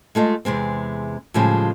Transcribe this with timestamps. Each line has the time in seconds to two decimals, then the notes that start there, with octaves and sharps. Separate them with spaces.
0.15 G#3 A3 F4 D#5
0.45 E2 C3 G#3 C4
1.34 A2 C#3 F3 G3 G#3